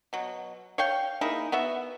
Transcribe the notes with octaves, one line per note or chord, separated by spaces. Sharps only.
B2 F#3
C#5 F5 G5
A#3 D#4 E4 G#4
B3 F#4 E5